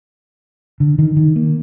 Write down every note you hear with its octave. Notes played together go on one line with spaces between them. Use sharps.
D3
D#3
D#3
A#3